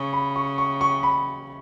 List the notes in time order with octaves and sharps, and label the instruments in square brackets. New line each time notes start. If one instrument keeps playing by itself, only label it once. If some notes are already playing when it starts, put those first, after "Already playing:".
Already playing: [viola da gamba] C#3 [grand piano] C#6
[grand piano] B5
C#6
C#6
C#6
B5